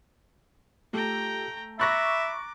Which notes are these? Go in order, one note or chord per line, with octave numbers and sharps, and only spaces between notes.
A3 F4 G4 A4 G5 A#5
E5 A#5 B5 C#6 D6 F#6 A6 A#6